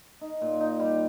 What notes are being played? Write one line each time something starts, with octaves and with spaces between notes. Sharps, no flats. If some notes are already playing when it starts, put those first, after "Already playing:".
D#4
A#2
D#4
G3